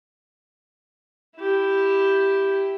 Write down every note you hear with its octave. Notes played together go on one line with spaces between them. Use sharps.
E4 G4